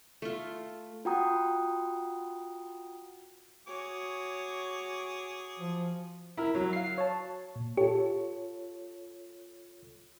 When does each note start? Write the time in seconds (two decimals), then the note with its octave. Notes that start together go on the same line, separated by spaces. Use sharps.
0.22 A3 F4
1.05 F4 F#4 F#5 G5 A#5 D#6
3.67 F#4 G#4 C#5 D6
5.59 F3
6.37 E4 A#4
6.55 F#3
6.73 F5 C7
6.98 C#5 A5
7.56 A#2
7.77 F4 G4 A4 C#5